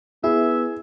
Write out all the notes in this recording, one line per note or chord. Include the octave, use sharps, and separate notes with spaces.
B3 E4 G#4 E5